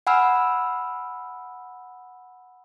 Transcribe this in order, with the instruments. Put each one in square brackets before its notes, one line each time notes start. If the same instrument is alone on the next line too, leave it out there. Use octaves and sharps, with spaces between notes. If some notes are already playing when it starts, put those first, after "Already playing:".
[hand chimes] F#5 G#5 B5 E6 F6